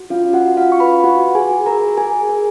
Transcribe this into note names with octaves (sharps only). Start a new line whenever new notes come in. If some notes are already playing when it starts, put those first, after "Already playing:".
Already playing: F#4
C#4 F4 F5
F#4 F#5
F4 F5
C#6
B4 B5
F#4 F#5
G#4 G#5
F#4
A#4 A#5
G#4 G#5
A#4